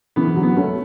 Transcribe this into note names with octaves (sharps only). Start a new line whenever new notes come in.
C#3 E3 B3
D3 F#3
B3
A3 C#4